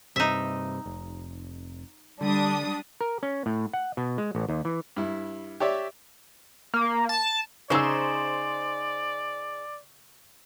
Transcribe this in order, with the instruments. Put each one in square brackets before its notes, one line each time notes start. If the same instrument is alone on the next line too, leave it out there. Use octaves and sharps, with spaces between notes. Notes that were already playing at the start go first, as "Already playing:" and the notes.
[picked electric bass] G2 C3 [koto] D#4 E5
[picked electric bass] F1
[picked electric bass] D3 [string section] G3 D4 D#6
[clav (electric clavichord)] A#4
C#4
A2
F#5
B2
G#3
A1
D#2
E3
[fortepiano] G2 E4
G4 C#5 D5 E5
[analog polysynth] A#3
A5
[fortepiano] C#3 E6 [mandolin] D#4 G#4 C5 [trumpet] D5